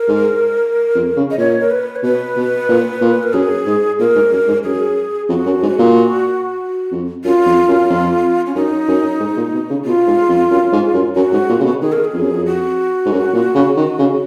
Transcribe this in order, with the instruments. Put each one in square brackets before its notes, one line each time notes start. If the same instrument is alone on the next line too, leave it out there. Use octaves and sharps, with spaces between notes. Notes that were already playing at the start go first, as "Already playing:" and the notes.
Already playing: [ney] A#4
[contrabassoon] G#2
F2
C#3
[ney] D#5
[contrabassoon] A#2 [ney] C#5
[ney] A#4
B4
C#5
[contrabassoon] B2 [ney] B4
[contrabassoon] B2
A#2
A#2
[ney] A#4
[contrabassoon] F#2 [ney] G#4
[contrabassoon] G#2
[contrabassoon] A#2 [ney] A#4
[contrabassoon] G#2
F#2
G#2
[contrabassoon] F#2 [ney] G#4
[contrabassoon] F2 [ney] F#4
[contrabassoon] F#2
G#2
A#2
F2
[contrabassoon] F#2 [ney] F4
[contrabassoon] F2
F#2
F2
[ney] C#4
[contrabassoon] F#2 [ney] D#4
[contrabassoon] F#2
G#2
A#2
B2
C#3
[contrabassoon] B2 [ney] F4
[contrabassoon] G#2
F2
F#2
G#2
F#2
[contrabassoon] F#2 [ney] F#4
[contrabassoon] G#2
A#2
C#3
B2
[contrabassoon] D#3 [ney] G#4
[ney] A#4
G#4
[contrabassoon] F2
F#2
F2
[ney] F#4
[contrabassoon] G#2
F#2
A#2
C#3
D#3
C#3